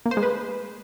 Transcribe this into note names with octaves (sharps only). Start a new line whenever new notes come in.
A#3
C5
G#3
B4